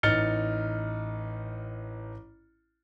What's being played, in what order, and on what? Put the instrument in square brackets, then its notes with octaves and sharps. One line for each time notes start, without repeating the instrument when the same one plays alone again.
[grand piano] A1 D#4 F6 A6 C#7 G7